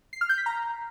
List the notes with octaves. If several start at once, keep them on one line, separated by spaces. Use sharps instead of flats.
C7
F6
G6
B6
A#5